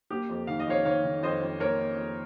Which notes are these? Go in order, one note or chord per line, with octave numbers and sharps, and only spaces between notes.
A#3 G4
F2
D#3 F5
D#5
F2 C#5 F5
D#3 C#5 F5
D#3
F2 C5 D#5
F2
A#3 A#4 C#5
A#3
F2